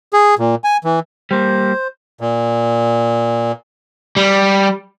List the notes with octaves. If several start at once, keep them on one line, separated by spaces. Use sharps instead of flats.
G#4
A#2
G#5
E3
G3 A#3 C5
A#2
G3